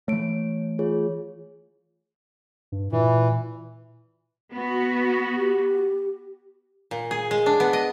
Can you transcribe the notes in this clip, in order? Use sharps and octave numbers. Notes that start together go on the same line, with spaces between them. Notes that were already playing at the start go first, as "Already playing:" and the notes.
E3 A3 C#5 D7
F4 G#4 C#5
G2
A#2 E3
B3 F#4
G4
A#2
G#4
G#3
D4
B3
D#5